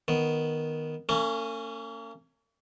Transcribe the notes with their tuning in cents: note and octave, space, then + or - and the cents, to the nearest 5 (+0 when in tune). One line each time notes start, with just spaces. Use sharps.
D#3 +0 B3 +0
A#3 -45 C#4 +0